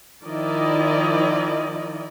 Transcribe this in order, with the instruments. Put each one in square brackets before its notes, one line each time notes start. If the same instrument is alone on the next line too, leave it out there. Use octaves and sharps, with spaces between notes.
[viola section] D#3 F3 E4 D5 D#5